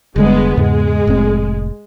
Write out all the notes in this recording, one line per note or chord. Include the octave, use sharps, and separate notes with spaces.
F1 D3 G3 G#3 B3
E2 G#2 C#3 G#3
F1 A2 C4